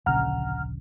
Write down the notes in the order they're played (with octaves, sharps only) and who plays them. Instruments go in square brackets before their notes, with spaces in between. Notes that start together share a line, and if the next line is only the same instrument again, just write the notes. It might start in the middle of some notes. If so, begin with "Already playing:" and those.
[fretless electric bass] D1 A#1 C#3 [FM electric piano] F#5 A#5 F6